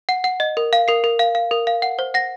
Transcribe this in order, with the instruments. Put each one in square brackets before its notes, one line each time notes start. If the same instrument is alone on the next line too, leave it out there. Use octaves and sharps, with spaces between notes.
[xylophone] F#5
F#5
D#5
A#4
F5
A#4 C7
A#4
F5
F5
A#4
F5
F#5
C5
F#5 A#6